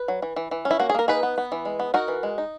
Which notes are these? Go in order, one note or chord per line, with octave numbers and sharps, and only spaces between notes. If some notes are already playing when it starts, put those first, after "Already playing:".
Already playing: B4
F#3
E3
E3
E3
C#4
E4
A#3 F#4
G#4
A#3 A#4
D#4 G#4 B4
B3
B3
E3
G#3
B3
D#4 F#4 A#4
E3
G#3
D#4